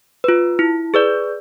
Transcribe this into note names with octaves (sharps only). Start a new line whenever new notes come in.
F4 B4
E4
G#4 B4 D5